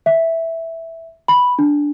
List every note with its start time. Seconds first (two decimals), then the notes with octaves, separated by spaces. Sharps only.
0.06 E5
1.28 B5
1.59 D4